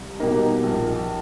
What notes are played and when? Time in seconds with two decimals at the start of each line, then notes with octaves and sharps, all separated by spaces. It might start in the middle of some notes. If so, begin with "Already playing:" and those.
Already playing: C2
0.20 B2 G3 A#3 D#4
0.63 A#1